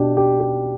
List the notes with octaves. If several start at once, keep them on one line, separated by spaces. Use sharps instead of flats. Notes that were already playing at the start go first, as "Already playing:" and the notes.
Already playing: B2 D4 G4
G4
G4